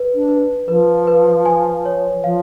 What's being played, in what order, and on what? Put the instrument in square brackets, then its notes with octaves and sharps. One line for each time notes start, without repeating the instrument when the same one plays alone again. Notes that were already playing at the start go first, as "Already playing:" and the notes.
Already playing: [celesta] B4
[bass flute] D4
[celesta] B4
[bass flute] F3 [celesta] B4
[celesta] B4
G#5
C#5
[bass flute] F3 [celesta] F5